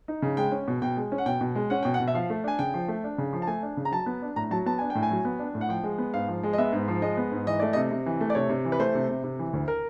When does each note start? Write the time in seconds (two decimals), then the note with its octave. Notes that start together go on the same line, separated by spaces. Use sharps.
0.08 D#4
0.22 C#3
0.37 G#3 G5
0.52 C#4
0.68 B2
0.82 B2 G5
0.97 G#3
1.12 C#4
1.18 F#5
1.26 B2 G5
1.41 B2
1.55 G#3
1.70 C#4 F#5
1.83 B2 G5
1.94 F#5
2.00 B2
2.08 E5
2.14 F3 F5
2.30 A3
2.44 D4 G#5
2.59 C#3 G5
2.74 F3
2.88 A3
3.04 D4
3.18 C#3
3.33 F3
3.42 A5
3.47 A3 G#5
3.63 D4
3.77 C#3
3.85 A#5
3.92 F#3 A5
4.06 B3
4.22 D4
4.36 A2 A#5
4.51 F#3 A5
4.66 B3 A5
4.78 D4 G#5
4.90 G5
4.95 A2
5.03 G#5
5.11 F#3
5.25 B3
5.39 D4
5.55 A2
5.61 F#5
5.69 F3 G5
5.84 G#3
5.98 B3
6.14 G#2 F5
6.28 F3
6.43 G#3
6.53 D#5
6.58 B3 E5
6.72 G#2
6.88 F3
7.02 G#3 D#5
7.17 B3
7.31 G#2
7.46 E3 D#5
7.60 A3 D5
7.73 C3 D#5
7.91 C3
8.06 E3
8.21 A3
8.30 D5
8.35 C3 C#5
8.49 C3
8.65 E3
8.72 B4
8.79 A3 C5
8.95 C3
9.09 C3
9.24 C3
9.39 E3
9.53 D2
9.68 A#4